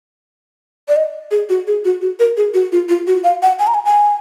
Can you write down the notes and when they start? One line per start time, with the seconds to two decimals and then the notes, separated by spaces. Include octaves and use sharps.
0.88 D5
0.96 D#5
1.31 G#4
1.49 F#4
1.67 G#4
1.85 F#4
2.01 F#4
2.20 A#4
2.37 G#4
2.54 F#4
2.72 F4
2.89 F4
3.07 F#4
3.24 F5
3.42 F#5
3.59 G#5
3.67 A#5
3.74 G#5
3.85 G#5